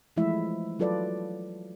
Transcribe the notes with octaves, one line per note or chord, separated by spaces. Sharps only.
E3 F3 G#3 A3 E4 E5
F#3 F4 A4 B4 D5